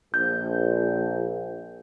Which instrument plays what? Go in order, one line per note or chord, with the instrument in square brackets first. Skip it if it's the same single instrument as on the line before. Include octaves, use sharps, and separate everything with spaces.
[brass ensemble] A#1 [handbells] G6